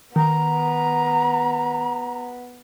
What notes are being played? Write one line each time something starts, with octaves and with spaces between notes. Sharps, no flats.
D#3 B3 A#5